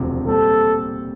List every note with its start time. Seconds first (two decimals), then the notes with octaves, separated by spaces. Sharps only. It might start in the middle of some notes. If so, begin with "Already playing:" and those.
Already playing: E1 D2 C3 F3
0.27 A#2 G3 C4 G4 A4